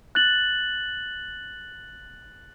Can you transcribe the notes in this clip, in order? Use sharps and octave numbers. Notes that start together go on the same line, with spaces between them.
F#6 A6 F#7